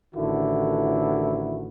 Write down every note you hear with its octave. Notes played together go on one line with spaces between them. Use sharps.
A1 D3 D#3 E4 F#4